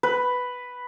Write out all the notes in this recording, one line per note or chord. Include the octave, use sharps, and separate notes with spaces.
B4